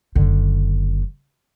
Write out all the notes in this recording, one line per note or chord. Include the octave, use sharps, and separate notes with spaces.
F#1 D3